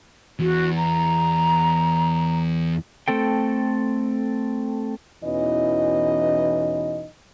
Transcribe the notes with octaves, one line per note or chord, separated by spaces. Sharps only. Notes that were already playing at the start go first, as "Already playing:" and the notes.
E2 F#4
A#5
A3 C4 A4 G5
E2 B2 E3 C#4 D#4 D#5